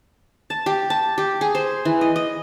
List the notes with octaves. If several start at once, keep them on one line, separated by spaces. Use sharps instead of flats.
A5
G4
A5
G4
G#4
C5
E3
D#5
D#5